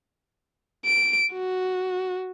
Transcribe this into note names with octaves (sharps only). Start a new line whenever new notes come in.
D7
F#4